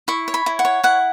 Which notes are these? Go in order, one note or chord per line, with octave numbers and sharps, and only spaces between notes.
E4 C#6
C#5
B5
E4
F#5
C#5
E4 F#5